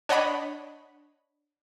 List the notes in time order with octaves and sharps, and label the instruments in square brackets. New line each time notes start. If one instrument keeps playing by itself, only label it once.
[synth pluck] D4 C#5 D#5 F#5 B5